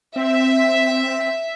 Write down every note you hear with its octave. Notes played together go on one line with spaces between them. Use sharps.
C4 E5